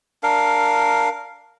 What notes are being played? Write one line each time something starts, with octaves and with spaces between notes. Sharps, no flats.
D4 A#4 F5